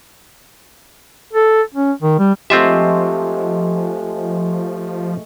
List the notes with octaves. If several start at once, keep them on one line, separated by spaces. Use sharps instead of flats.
A4
C#4
D#3
G3
F3 G#3 A3 C4 F4 G4 E5